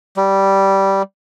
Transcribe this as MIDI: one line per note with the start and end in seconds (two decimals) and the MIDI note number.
0.17 1.02 55